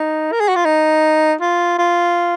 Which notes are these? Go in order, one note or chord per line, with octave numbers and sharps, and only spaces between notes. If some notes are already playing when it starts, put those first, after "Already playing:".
Already playing: D#4
A#4
G#4
F#4
F4
D#4
F4
F4